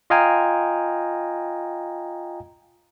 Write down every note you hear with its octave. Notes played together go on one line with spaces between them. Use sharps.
F4 D#5 F5 G5 G#5 A#5